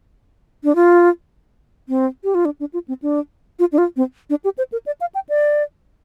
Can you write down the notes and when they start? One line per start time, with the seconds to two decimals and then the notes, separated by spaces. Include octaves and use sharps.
0.64 D4
0.75 F4
1.89 C4
2.24 G4
2.35 F4
2.45 D4
2.60 D4
2.73 F4
2.88 C4
3.02 D4
3.59 F4
3.72 D4
3.78 F4
3.97 C4
4.30 D4
4.44 G4
4.58 C5
4.72 A#4
4.86 D5
5.01 F5
5.15 G5
5.29 D5